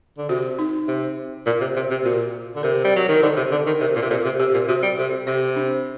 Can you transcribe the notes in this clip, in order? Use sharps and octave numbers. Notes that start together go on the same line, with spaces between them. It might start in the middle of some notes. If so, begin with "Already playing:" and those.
D3
C3 F#4
D#4
C3
A#2
C3
C3
C3
A#2 F#4
D3
C3 A#4
G3
F#3
D#3
D3 C5
C3
D3
D#3
C3 A#4
A#2
C3
A#2 A4
C3
C3 G4
A#2
C3 F#4
G3
C3 A4
C3 C5
D4